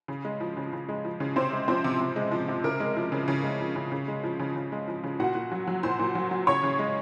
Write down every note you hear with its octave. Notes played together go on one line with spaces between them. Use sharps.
C#3
G#3
F3
C#3
C#3
G#3
F3
C#3
C3 C4 C5
G#3
F3 C4 C5
C3
C3
G#3
F3
C3
C#3 A#4
G#3
F3
C#3
C#3
G#3
F3
C#3
C#3
G#3
F3
C#3
C#3
G#3
F3
C#3
A#2 F#4 F#5
A#2
F#3
F#3
A#2 C5 C6
A#2
F#3
F#3
C#3 C#5 C#6
C#3
G#3